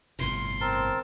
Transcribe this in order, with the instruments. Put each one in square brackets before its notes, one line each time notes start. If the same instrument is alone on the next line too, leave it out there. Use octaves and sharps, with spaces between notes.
[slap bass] G1 A2 C3 [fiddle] C6
[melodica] C4 A#4 A5